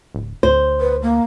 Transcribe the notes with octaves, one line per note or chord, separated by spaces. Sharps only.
D1
D2 C5
B4
A#3